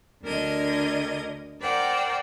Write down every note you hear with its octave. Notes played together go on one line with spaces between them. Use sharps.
D2 D3 A#4 D#5 G#6
A#4 C5 D5 F#5 G5